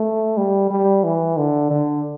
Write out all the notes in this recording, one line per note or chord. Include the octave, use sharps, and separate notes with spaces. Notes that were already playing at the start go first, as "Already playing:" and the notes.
Already playing: A3
G3
G3
E3
D3
D3